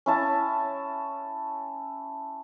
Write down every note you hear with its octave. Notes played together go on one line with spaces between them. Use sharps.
C#4 E4 A5